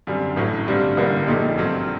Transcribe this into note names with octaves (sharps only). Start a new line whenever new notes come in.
F#2 D3 G3 C4
A1 A2 F#3 A3
G2 D3 G3 C4
A1 G2 D3 G3 A#3
A#1 A#2 A3 D#4 G4
G2 F#3 A3 C4